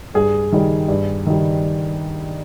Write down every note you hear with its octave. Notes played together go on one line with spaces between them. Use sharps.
G2 G#4
D#3 G3
G2
D#3 G3